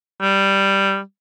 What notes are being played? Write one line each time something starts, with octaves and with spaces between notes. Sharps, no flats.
G3